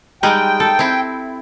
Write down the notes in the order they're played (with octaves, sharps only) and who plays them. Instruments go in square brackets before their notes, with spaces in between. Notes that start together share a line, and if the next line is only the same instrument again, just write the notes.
[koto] G3 G#3 D#4 [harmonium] G5
[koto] A4
C4 E4